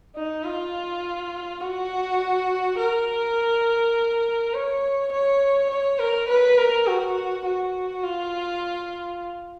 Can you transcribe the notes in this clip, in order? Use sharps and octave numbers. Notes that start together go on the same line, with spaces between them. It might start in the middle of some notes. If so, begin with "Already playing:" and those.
D#4
F4
F#4
A#4
C#5
C#5
C#5
A#4
B4
A#4
F#4
F#4
F4